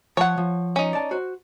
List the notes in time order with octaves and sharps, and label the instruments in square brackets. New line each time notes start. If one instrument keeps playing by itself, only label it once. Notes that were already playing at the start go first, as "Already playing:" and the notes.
[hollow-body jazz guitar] F3 A5 [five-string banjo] C#5 F#5
[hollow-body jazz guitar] F3
[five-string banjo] C#4 D#4
[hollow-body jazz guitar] D5 A5
F#4 C5